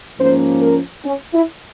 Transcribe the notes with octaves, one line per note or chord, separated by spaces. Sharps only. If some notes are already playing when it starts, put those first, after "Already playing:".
G#2 F3 A#3 C#4 C5
A#4
C#4
E4